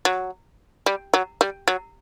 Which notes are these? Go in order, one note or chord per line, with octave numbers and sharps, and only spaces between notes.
F#3
G3
F#3
G3
F#3